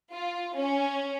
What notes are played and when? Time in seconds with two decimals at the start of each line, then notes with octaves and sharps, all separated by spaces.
0.12 F4
0.55 C#4